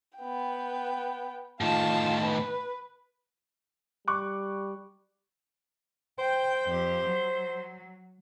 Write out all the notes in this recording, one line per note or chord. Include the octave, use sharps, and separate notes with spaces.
B3 G5
A2 D#3 F4 A5
B4
G3 C#6 D6 F#6
C5 G5 G6
F2 G4
F#3